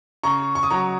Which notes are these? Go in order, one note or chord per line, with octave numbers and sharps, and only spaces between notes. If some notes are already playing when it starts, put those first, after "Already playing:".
C#3 A#5 C#6
C#6
D#6
F#3 A#5 C#6